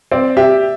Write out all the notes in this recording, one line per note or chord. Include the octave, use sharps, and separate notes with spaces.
C4 D5
G4 E5